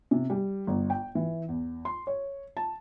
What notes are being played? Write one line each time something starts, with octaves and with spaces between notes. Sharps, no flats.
C3
G3
G1
G5
E3
E2
C6
C#5
A5